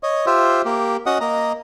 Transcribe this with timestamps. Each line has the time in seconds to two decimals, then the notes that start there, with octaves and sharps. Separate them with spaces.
0.03 C#5 D#5
0.26 F4 G4 C5 E5
0.65 A#3 G4
1.06 C#4 F#4 D#5 F#5 D#6
1.21 A#3 D#5 A#5